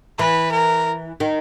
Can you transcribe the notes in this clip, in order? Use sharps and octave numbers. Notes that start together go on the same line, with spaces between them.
E3 B4
A#4
D#3